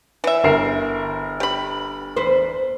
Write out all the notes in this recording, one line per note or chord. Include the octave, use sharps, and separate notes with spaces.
E3 E5
G1 A#4 C7
G4 B5
E2 B4 C5